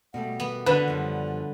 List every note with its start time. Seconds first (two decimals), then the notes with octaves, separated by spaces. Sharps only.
0.14 B2 G3 A3 F#5
0.40 B3
0.66 D3 B4
0.88 F#2 F3 G3